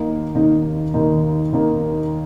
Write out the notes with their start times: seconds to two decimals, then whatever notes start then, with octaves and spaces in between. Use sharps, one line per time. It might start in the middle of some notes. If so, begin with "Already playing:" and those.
Already playing: D#2 D#3 A#3 D#4
0.35 D#2 D#3 A#3 D#4
0.94 D#2 D#3 A#3 D#4
1.52 D#2 D#3 A#3 D#4